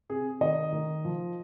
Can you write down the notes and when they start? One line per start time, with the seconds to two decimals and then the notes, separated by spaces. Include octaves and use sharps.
0.09 C3 G#4
0.41 D#3 D#5
0.72 D#3
1.05 F3